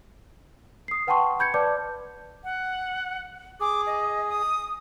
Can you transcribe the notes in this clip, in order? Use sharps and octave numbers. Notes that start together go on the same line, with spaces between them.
D#6 C7
B4 F#5 G5 A5 C6 C#6
B5 G6 G#6 C#7
B4 D5 A5 D6 G6
F#5
G#4 D6
D#5
D#6